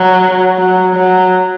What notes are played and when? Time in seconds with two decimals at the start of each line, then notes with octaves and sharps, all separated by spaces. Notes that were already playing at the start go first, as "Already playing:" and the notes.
Already playing: F#3
0.57 F#3
0.95 F#3